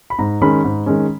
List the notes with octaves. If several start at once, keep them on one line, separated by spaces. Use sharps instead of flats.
B5
G#2 A#5
D#3 G#3 C#4 B5
G#2
D#3 G#3 C#4